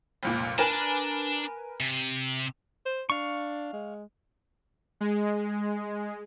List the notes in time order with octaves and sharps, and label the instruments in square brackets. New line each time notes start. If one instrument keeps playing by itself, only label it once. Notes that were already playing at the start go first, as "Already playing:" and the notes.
[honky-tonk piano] F1 C#2 A#2
[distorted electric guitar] D4 A5 [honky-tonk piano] A#4 B4 G#5
[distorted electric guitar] C3
[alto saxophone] C5
[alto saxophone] D4 [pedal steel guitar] F5 C#6
[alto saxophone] G#3
[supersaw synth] G#3